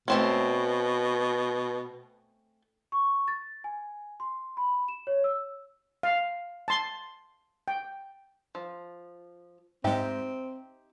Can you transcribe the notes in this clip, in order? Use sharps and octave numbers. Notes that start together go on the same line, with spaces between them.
B2 A3 C4 C#4
C#6
A6
G#5
C6
B5
E7
C#5
E6
F5
A5 C6
G5
F3
G#2 G#3 C4 D#4 G4 E5